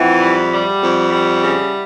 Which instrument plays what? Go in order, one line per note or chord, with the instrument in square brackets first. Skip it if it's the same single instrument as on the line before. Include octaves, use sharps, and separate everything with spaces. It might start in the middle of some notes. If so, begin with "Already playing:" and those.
Already playing: [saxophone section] F2 E3 [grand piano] E5 F#5 G5
[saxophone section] G3
G3
F2
G3
C#3